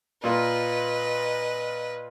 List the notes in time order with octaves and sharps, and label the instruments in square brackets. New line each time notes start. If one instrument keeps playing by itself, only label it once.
[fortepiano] A#2 F4 A#4 [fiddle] B4 D#5